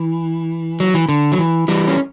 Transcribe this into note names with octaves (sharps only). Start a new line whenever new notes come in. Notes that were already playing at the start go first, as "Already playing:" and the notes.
Already playing: E3
F#3
E3
D3
F#3
E3
E3 G3
C#4